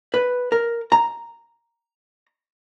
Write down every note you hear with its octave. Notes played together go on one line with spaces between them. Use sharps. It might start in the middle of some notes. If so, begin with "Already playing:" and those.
B4
A#4
A#5